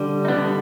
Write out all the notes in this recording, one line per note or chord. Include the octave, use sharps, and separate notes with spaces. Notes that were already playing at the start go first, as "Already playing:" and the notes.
Already playing: D3 G3
D#4
D3 G3 B3 D4